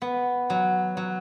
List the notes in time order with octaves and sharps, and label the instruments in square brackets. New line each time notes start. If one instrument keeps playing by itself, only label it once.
[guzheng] B3
F#3
F#3